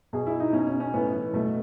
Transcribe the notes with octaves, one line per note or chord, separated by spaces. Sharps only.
B2 G#4
E4
D#4
B2 C#4
C#4
C#4
A2 B3
E3
B2 A3